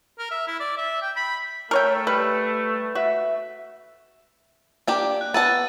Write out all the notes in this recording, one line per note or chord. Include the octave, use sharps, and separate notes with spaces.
A#4
E5
E4
D5
E5
G5
B5
A3 A#4 C#5 G5
G3 B4
F#4 E5
A#3 D4 G4
F#6
B3 F#5 A5 E6 A6 D#7